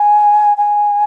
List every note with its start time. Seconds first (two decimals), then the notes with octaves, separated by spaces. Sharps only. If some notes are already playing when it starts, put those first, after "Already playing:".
Already playing: G#5
0.57 G#5